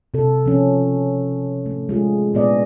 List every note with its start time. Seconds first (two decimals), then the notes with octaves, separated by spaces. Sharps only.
0.14 C3 A4
0.46 F3 C#4
1.66 A3
1.89 G#3 F4 G#4
2.34 A#2 B3 G#4 D5 D#5